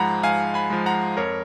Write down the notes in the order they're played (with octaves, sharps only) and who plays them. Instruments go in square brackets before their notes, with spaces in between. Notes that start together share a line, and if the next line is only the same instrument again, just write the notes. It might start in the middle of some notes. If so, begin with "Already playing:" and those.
Already playing: [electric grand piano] G#2 F3 G#3 F#5 A#5 B5
G#2 F5 G#5
G#5 B5
F3 G#3
F#5 A#5
F2 A#4 C#5